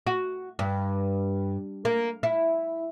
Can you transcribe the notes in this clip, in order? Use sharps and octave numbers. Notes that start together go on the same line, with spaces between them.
F#4
G2
A#3
E4